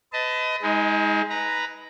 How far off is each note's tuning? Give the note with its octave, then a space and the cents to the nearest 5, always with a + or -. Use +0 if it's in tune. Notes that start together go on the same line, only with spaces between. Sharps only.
B4 +35 D#5 +20 A5 +5
G#3 +0 D#4 +35
B4 +0 A#5 +0